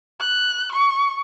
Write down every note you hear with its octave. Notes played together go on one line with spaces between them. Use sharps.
F#6
C#6